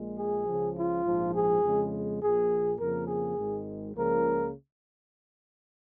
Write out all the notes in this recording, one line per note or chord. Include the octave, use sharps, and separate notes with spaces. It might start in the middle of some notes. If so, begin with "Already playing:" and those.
Already playing: A#1 A#2 G#3
G#4
C#2 C#3 F3
F4
A#1 G#2 F3
G#4
F2 C#3 G#3
A#1 A#2 F3 G#4
F2 C#3 F3 A#3 A#4
G#4
G#1 G#2 D#3 G#3
C#2 C#3 F3 A#3 A#4